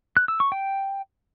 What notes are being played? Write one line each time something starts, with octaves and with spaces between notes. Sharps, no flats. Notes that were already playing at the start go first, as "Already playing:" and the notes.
F#6
E6
C#6
G5